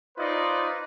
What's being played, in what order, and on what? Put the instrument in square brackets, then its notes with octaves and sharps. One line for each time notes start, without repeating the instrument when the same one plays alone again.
[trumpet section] D#4 F4 B4 C5 D5 D#5